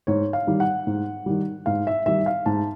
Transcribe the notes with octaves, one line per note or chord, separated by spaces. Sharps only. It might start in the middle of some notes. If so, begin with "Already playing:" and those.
G#2 C#5
F5
D#3 G3
F#5
G#2
D#3 G3
G#2 F5
E5
D#3 G3 E5
F5
G#2 A5